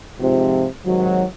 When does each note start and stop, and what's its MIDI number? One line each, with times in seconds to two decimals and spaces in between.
0.20 0.66 44
0.20 0.66 48
0.20 0.66 53
0.85 1.24 44
0.85 1.24 48
0.85 1.24 51
0.85 1.24 54